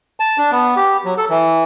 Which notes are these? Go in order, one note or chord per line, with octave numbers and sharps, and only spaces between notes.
A5
D4
B3
G4
F#3
A4
E3